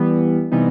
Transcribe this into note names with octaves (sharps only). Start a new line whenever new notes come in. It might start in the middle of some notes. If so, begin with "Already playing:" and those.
Already playing: E3 G3 B3
C3 E3 G3 B3 D#4